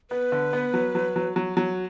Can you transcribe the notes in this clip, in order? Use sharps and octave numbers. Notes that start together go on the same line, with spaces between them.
B3 B4
D3
B3
F#3
F#3
F#3
F#3
F#3